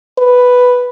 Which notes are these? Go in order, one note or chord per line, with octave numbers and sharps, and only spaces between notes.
B4